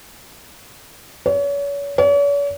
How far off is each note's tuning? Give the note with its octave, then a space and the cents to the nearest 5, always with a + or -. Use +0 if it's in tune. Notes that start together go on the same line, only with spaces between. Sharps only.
C#5 +35
C#5 +45